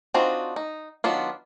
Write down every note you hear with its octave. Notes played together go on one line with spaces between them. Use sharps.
C4 D4 D#4 F4 F#4
D#4
D#3 F#3 B3 D4 F4